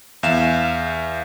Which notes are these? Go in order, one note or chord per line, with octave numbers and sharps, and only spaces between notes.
E2 E5 F5 E7